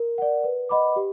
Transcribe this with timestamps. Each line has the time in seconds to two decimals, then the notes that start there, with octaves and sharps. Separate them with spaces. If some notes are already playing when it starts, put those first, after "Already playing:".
Already playing: A#4
0.18 D5 F#5
0.44 B4
0.69 D#5 F#5 B5 D6
0.96 G4